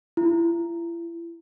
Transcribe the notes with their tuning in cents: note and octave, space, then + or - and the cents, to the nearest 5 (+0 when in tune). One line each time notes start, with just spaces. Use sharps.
E4 +40